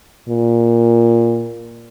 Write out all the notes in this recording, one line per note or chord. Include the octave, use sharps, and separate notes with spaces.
A#2